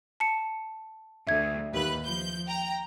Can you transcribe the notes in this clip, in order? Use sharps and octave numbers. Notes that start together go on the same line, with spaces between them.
A5 C#7
D2 E5 G#6
D#2 B4 F#6
F3 G6
G5 A#5